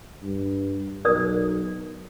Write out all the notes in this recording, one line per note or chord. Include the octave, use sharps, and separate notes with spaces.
G2
B1 A#4 D5 D#6